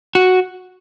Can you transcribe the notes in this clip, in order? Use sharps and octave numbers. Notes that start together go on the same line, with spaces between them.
F#4